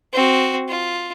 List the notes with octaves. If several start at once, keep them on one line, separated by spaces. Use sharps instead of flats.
C4 F#4
F4